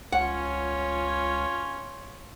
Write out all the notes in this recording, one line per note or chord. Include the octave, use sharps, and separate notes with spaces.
C#2 C#4 F4 C#5 F#5